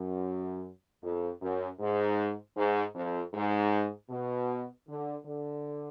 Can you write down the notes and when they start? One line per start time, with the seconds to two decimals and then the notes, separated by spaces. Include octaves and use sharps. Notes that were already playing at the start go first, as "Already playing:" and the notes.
Already playing: F#2
1.02 F2
1.41 F#2
1.80 G#2
2.56 G#2
2.94 F2
3.34 G#2
4.10 B2
4.88 D3
5.25 D3